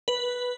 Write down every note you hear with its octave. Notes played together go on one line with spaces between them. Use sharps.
B4